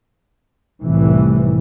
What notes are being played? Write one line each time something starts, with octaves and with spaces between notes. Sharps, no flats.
F1 C2 A2 E3